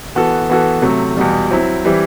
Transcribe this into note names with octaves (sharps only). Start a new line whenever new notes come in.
E3 B3 F#4 A4
E3 B3 F#4 A4
C3 F#3 A3
E2 B2 G3
F#3 C4 E4
E3 G3 C4 E4 G4